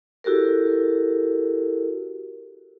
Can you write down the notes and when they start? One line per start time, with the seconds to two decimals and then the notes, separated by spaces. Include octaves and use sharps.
0.24 E4 F#4 G4 A4 A#4